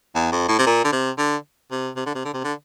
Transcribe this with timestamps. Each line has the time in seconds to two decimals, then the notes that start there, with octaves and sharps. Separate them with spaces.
0.15 E2
0.32 F2
0.49 A2
0.59 C3
0.66 A#2
0.84 D3
0.92 C3
1.18 D3
1.71 C3
1.96 C3
2.06 D3
2.15 C3
2.25 D3
2.34 C3
2.44 D3